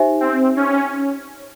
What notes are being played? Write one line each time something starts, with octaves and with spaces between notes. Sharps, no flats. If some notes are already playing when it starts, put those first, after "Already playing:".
Already playing: D#4 G4 C5 E5 G#5
C4
C#4